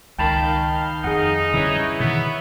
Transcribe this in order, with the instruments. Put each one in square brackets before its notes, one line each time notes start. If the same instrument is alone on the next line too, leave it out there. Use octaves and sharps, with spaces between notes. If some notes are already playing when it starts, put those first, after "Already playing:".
[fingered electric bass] C#2 [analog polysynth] D#3 F5 G6 [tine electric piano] G5 A5 B5
[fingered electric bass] F2 [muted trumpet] D#4 [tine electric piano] G#4 F#5
[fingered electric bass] D3 G3 C#4 [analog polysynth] E4 B4 C#5
[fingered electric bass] B2 D#3 E3 [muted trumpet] B3